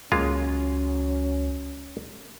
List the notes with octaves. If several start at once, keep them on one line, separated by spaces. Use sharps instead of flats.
C#2 F#3 G#3 A#3 C#4 F4